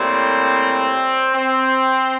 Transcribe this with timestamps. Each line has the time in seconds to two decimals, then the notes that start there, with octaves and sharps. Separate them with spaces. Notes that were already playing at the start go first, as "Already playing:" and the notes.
Already playing: A2 G3 A#3 C4
1.35 C4